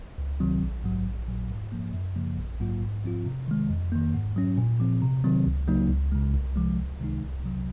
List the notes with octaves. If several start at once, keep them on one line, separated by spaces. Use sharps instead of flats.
C#2
C3 D#3 F#3 C4
A#1
G#2 F#3
A#1
A#2 F#3
G#2
F3 A#3
F#2
C#3 F3 A#3
A#1
G#2 F#3 A#3 F4
G#2
F3 C4 F4
C3
D#3 G#3
F2
D#3 A#3
G#2
F#3 C#4
A#2
F3 C4
C3
D#3 F#3 C4
C#2
C#3 F#3 A#3 D#4
C#2
C#3 G#3
C2
C3 F3 G#3
C#2
C3 D#3 G#3 D#4
C2
C3 F#3